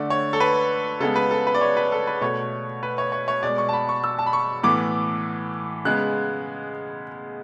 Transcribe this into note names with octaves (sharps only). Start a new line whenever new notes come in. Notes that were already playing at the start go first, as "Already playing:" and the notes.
Already playing: D3 A3 D5
C#5
A4
B4
C#3 G#3 B3 A4
B4
A4
B4
D5
C#5
B4
A4
B4
B2 A3 C#5
B4
C#5
C#5
C#5
B2 G#3 B3 D5
C#6
A5
B5
C#6
E6
A5
B5
C#6
A2 E3 B3 D6
C#3 G#3 B3 F#6